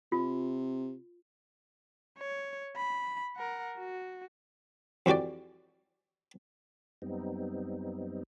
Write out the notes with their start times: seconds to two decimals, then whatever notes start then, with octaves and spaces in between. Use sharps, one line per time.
0.12 C3 F4
2.18 C#5
2.76 B5
3.37 A#4 F#5
3.79 F#4
5.06 F2 E3 F#4 G4 D5
7.02 F#2 G3 B3 C4 D#4